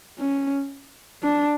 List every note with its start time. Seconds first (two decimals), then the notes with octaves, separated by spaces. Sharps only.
0.19 C#4
1.23 D4